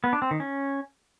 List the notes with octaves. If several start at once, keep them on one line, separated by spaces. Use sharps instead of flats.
B3
D4
C4
D#3
C#4